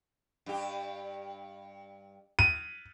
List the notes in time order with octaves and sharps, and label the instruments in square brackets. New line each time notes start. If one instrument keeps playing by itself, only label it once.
[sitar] G2 G4
[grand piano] D#7